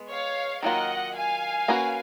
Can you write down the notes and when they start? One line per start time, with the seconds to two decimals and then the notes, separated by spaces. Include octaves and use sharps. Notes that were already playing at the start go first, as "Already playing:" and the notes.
Already playing: G#3 B3
0.10 C#5 F5
0.63 D#3 F#3 A#3 F4 A#4 D#5 F#5
1.15 F5 G#5
1.68 A#3 C#4 F#4 B4